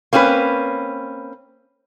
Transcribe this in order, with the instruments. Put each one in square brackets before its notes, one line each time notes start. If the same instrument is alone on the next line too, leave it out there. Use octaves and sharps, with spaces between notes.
[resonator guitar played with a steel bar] A#3 C4 C#4 F#4 B4